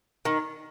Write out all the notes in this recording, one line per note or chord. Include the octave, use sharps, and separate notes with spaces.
D#3